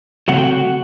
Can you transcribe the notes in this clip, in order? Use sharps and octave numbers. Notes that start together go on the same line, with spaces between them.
C#3 F#3 A3 C4 F#5
G5
F#4 F#5